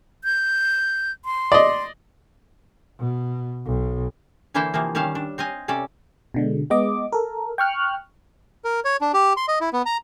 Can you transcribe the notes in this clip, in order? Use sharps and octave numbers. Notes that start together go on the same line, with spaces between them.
G6
C6
D5 D#5
B2
B1
D3 E3 A#3 E4 A4 C5
C3 E3 F3 A#3
D#3 G3 C#4 F5 A5
D4
C4 D#5 F5 G#5
C3 C#4 A4 D5
B2 D3 G#3
G#3 B3 D#5 D6
A4 A#4
G5 C#6 F6 F#6
A#4
C#5
D4
G4
C6
D#5
E4
B3
A#5